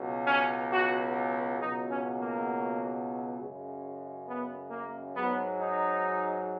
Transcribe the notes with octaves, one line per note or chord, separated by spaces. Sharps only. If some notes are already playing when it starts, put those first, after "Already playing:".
Already playing: C#2 B2 F#3
C#4
F#4
C#2 B2 F#3 D#4
C#4
A#3
F#2 C#3 G#3
B3
A#3
G#2 F#3 B3
D#4